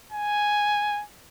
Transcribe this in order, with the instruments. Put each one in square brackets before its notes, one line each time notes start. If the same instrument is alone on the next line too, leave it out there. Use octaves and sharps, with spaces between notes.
[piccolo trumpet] G#5